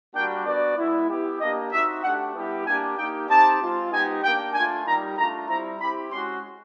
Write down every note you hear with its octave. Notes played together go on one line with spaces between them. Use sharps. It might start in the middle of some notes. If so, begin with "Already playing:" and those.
G3 A#3 D4 F#4 G5
B3 D4 F#4 D5
G#3 B3 E4
B3 E4 G4
A#3 D4 G4 D#5
C4 D#4 F#4 E5
A3 D4 G4 F#5
G3 B3 E4 G4
A#3 D4 G4 G#5
A#3 D#4 G4 G5
C4 D#4 G4 A5
G#3 C4 F4
G#3 B3 D#4 G4 G#5
A#3 D4 G4 G5
A3 D4 F4 G#5
G3 A#3 D#4 G4 A#5
A3 D4 F4 A#5
G3 C4 E4 A#5
C4 E4 G4 B5
G#3 C#4 F#4 C6